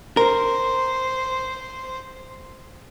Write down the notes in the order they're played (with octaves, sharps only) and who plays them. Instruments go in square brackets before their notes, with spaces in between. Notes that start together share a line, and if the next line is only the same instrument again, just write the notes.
[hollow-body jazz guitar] A#4 [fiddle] C5